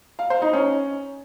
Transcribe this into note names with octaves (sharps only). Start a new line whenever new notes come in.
F5
C5
D#4
C#4